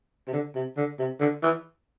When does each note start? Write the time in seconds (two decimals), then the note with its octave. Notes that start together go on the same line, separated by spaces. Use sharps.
0.28 C3
0.33 D3
0.55 C3
0.77 D3
0.99 C3
1.20 D3
1.43 E3